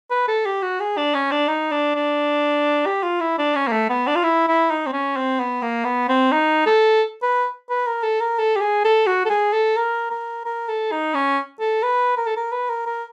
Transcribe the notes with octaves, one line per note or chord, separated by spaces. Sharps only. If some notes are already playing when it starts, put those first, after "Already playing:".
B4
A4
G4
F#4
G#4
D4
C#4
D4
D#4
D4
D4
G4
F4
E4
D4
C#4
A#3
A3
B3
D4
F4
E4
E4
D#4
C4
C#4
C4
B3
A#3
B3
C4
D#4
A4
B4
B4
A#4
A4
A#4
A4
G4
G#4
A4
F#4
A4
G#4
A4
A#4
A#4
A#4
A4
D#4
C#4
A4
B4
A#4
A4
A#4
B4
A#4
A#4